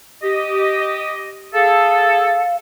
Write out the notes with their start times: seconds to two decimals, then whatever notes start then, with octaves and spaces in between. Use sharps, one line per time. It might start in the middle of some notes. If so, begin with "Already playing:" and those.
0.23 G4 D#5
1.54 G#4 A4 F5